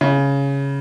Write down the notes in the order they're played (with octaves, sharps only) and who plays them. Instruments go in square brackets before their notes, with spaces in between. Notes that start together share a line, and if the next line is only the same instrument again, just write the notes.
[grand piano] C#3